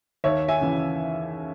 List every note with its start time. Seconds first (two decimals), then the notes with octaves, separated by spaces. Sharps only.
0.24 D#2 C#5 E5
0.48 E5 G#5
0.60 C#3 E3